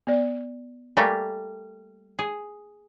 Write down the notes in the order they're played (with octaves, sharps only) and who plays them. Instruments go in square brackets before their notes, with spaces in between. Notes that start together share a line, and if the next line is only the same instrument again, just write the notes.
[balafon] B3 D5
[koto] G3 A3 A#3 [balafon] F5 G#5
[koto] G#4